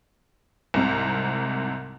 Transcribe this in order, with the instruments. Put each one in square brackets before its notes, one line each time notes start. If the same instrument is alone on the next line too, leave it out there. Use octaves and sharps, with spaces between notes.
[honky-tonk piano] C2 G#2 C3